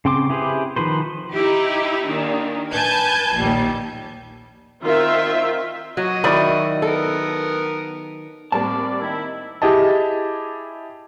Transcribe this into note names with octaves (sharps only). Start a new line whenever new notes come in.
C#3 C4 G5 C6 D6
E4 G4 G#4 B4 C5
D#3 F3 B4 C5
D#4 E4 G4
A#2 D#3 D4
B4 G#5 A5 G6 G#6
A#1 D#2 G3
D#3 C4 F4 A#4 E5
F#3 F#4 D#5
D#3 E4 D5 B5
B3 A4 A#4
A2 G3 A#3 C4 D5 A5
D#3 C4 E4
E4 G4 G#4 D#5 A5